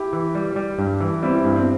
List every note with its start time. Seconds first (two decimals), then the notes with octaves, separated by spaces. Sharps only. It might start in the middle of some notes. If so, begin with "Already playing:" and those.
Already playing: E4 G4
0.13 E3
0.35 G3
0.56 G3
0.79 G2
1.01 E3
1.23 G3 C4 E4
1.44 G2
1.56 C4